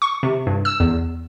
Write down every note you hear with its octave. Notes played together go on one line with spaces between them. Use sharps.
C#6
C3
G2
E6
E2